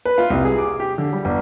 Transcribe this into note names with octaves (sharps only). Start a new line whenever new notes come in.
B4
F4
C2
G#4
D6
G4
D3
G3
G1